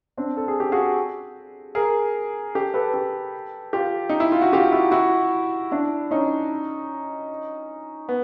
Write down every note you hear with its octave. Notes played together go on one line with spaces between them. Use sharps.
C4 D4
A4
G#4
G4
F#4 G#4
G#4 A#4
G4 A4
A4 B4
G4 A4
F4 G4
D#4
E4
F4
F#4
F4 G4
E4 F#4
E4 F#4
D4 E4
C#4 D#4
B3